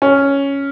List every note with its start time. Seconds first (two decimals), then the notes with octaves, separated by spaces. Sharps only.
0.02 C#4